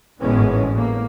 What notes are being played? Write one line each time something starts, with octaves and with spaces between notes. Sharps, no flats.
G#1 A2 E3 G#3 B3 C#4
A2 A#3